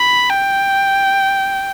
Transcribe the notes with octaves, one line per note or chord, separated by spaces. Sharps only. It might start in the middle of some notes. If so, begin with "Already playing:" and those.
Already playing: B5
G5